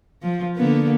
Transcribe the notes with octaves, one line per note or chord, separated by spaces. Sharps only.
F3
D3 A#3 B3